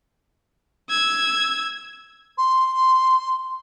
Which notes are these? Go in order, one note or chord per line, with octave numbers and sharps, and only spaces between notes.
E6 G#6
C6